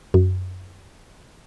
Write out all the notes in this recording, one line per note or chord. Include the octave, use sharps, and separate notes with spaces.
F#2